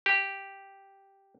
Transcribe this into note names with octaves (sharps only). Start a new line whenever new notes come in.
G4